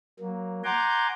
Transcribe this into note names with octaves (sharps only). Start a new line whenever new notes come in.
F#3 A#3
F#5 G#5 A#5 C6 D6 G6